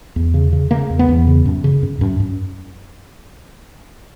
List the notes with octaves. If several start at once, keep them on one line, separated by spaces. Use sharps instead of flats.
E2
C#3
C#3
C#3 A#3
E2
B3
E2
C#3
F#2
C#3
F#2
F#2
F#2